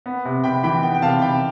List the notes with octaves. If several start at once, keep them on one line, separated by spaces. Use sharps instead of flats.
B3
C3
C3 G5 B5
E3 G5 B5
B3 G5
G5
C3 F5 A5
C3 G5 B5